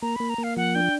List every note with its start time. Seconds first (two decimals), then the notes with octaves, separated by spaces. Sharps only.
0.02 A#3 A#5
0.16 A#3 B5
0.30 A#5
0.38 A#3
0.43 F5
0.57 F3 F#5
0.75 D4 G5